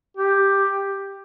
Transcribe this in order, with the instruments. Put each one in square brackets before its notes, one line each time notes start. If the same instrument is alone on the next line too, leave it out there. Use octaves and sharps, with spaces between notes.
[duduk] G4